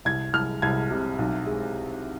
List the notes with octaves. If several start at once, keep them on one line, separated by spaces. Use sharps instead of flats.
C2 G#6
C2 F6
C2 G#6
C3
B1
G#3